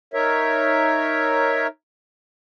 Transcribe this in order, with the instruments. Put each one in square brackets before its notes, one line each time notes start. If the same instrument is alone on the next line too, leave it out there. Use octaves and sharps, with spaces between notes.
[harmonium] D#4 A#4 C#5 E5